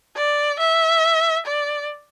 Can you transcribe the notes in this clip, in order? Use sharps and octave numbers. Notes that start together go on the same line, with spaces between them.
D5
E5
D5